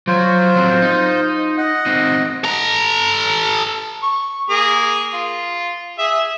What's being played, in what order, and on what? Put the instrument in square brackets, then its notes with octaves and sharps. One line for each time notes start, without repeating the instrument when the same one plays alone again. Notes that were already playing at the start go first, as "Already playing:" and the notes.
[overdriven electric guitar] F#3 C#5 [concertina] F4 C5
[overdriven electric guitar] F#3 C4
D#4
[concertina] D#5 F#5
[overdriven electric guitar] C4 D#4
[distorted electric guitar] A4 A#5
[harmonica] C#6
A#3 G#4
F4
G#4 E5